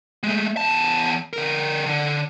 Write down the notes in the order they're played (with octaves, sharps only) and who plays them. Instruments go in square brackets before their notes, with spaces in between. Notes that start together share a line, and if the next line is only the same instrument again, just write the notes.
[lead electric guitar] G#3 A3
E2 A5
D3 A#4
D3